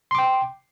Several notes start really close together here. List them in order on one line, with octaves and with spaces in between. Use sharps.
C6 D6 G5